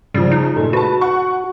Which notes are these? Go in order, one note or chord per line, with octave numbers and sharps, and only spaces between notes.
C#3 F3 G3
D#4
A#2 G#3 A3
F#4 B4 A5
F#5 C#6